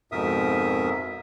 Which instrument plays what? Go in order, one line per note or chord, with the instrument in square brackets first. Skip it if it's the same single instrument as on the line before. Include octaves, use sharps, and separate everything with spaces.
[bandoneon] F2 G#2 B2 A#4 E5 D#6